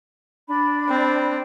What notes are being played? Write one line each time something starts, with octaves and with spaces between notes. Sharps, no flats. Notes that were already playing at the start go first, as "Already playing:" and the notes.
D4 B5
C4